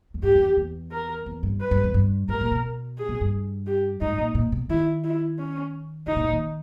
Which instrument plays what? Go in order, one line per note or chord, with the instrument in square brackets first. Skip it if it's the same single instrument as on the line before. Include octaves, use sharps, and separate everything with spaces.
[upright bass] E2
[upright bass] G2 [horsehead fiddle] G4
[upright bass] E2
E2
[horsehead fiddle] A#4
[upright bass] E2
G2
[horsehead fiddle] B4
[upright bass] G2
E2
G2
[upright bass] G#2 [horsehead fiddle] A#4
[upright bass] A#2
B2
[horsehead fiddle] G#4
[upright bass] B2
G2
[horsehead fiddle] G4
[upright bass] G#2 [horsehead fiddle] D#4
[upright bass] A#2
A#2
B2
[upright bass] D#3 [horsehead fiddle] E4
[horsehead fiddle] E4
C#4
[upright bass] C#3 [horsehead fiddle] D#4
[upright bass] B2
A#2
D#3